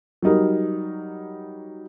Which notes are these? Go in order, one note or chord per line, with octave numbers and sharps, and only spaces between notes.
F#3 G3 D#4 A#4